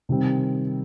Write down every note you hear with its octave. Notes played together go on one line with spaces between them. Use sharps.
C3 D#3 G3 C4